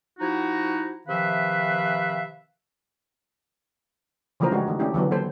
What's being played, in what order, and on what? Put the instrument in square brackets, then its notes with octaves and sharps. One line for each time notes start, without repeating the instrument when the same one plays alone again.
[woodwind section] F3 D#4 E4 F#4
C3 D#3 F3 B4 E5 F5
[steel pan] C#3 E3 F3 A3 A#4 C5
G#3 D4 F#4 G4 C#5
D#3 A3
A3 C#4 D4 E4 G4
D3 E3 F#3 B3
A#3 A4 C5